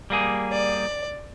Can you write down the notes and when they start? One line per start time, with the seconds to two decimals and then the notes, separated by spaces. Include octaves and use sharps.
0.10 G3 A#3 G#4
0.52 D5